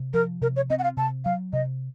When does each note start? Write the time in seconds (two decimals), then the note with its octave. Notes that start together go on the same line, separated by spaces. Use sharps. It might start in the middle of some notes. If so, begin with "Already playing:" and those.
Already playing: C3
0.14 F3 A#4
0.42 C3 A#4
0.56 C#5
0.70 C4 D#5
0.79 F#5
0.84 F5
0.97 C3 A5
1.25 F#3 F5
1.53 C3 D#5